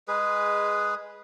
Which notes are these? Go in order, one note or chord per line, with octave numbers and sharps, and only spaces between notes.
G#3 G#4 B4